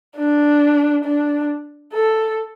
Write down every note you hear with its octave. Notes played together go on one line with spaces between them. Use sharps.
D4
D4
A4